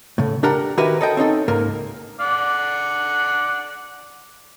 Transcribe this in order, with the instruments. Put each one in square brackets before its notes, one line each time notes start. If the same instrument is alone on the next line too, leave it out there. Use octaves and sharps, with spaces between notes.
[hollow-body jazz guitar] A2 C#3
D4 G4 A#4 F#5 A#5
D#3 E4 F#4 G4 A#4 B4
A4 D#5 G5
C4 C#4 D#4 A4
C#2 G#2 A#3 A#4
[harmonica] D5 F#5